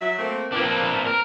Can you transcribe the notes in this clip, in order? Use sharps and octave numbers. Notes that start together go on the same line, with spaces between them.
F#3 E5
A3 A#3 C4
F3 A#3 C4 D4 B4
A#4